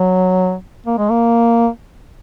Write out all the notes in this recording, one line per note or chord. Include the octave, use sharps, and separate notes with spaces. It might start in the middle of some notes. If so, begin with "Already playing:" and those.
Already playing: F#3
A#3
G#3
A#3